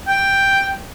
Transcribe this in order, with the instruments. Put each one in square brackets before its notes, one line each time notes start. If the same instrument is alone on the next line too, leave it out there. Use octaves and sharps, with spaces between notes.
[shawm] G5